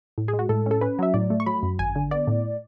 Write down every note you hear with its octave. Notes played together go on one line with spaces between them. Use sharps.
A2
G#4
G#3
F#4
A2 A4
C#4 A4
C#4 B4
F#3 E5
A2 D5
A3
C#6
F#3 B5
F#2
G#1 G#5
D3
B3 D5
A2